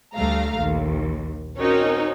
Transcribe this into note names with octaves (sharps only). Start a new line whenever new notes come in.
D2 G3 A3 F5 A#5
A#1 D#2
C4 C#4 D#4 F#4 A#4 C#5